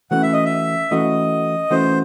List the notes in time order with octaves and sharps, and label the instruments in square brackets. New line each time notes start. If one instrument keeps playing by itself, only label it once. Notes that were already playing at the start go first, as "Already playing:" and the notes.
[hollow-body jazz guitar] E3 A3 C#4 F#4 [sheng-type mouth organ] F#5
[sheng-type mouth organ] E5
D#5
E5
[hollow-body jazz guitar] E3 A3 C#4 F#4 [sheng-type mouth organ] D#5
[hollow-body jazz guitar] E3 A3 C#4 F#4 [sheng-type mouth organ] C5